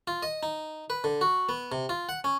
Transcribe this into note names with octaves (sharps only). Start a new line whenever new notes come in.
F4
D#5
D#4
B4
D3
F#4
B3
C3
F4
F#5
C#4